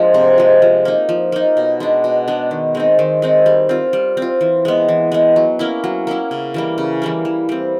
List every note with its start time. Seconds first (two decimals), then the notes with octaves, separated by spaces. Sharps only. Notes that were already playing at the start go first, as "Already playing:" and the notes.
Already playing: F3 G#3 A#3 D4
0.14 C3
0.38 F3 G#3
0.62 F3
0.85 A#3 D#4
1.09 F3
1.32 A#3 D#4
1.57 B2
1.80 G#3 B3 D4
2.04 B2
2.28 G#3 B3 D4
2.51 D#3
2.75 G#3 C4 D#4
2.99 D#3
3.22 G#3 C4 D#4
3.46 G3
3.69 C4 F4
3.93 G3
4.17 C4
4.22 F4
4.41 E3
4.65 G#3 B3
4.89 E3
5.12 G#3 B3
5.36 F#3
5.59 A#3 C#4 E4
5.84 F#3
6.07 A#3 C#4 E4
6.31 C#3
6.54 E3 G3 A#3
6.78 C#3
7.02 E3 G3 A#3
7.25 E3
7.49 G3 C4